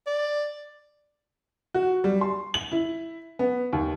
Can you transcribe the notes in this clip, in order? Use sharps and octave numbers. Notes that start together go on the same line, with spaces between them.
D5
F#4
G3
C6
F#7
E4
B3
D#2